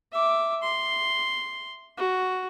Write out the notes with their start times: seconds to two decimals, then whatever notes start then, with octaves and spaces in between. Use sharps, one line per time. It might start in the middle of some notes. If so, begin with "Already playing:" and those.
0.12 E5 D6
0.62 C6
1.97 F#4